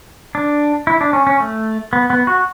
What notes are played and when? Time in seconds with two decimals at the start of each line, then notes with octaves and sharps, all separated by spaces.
0.35 D4
0.87 E4
1.01 D4
1.13 C#4
1.27 C#4
1.40 A3
1.93 B3
2.10 B3
2.27 F#4